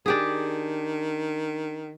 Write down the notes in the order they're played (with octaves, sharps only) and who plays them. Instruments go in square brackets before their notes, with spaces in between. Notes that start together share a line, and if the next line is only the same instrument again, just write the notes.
[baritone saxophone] D#3 [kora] D4 G4 G#4